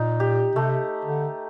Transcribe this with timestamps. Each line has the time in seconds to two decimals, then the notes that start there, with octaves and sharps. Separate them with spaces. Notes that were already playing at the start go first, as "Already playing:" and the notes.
Already playing: A#2 D#4
0.20 G4
0.56 C3 A3
1.05 D3